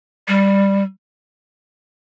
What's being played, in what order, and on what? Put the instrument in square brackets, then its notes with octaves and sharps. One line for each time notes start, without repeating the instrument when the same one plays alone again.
[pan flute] G3